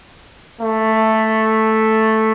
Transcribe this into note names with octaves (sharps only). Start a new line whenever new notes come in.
A3